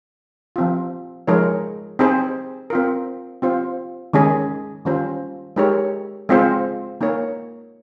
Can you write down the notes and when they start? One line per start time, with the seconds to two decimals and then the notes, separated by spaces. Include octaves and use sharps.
0.56 F3 C4 F4
1.27 F3 G#3 D#4 A#4 C#5
1.99 C4 D#4 G#4 C5
2.70 C4 F4 A#4
3.42 C4 F4 C5
4.13 D#3 G#3 C#4 G#4
4.85 D#3 G3 C#4 F4 C5
5.56 G#3 D#4 G4 A#4 C#5
6.29 G#3 C4 F4 C5
7.01 A#3 D#4 A#4 C#5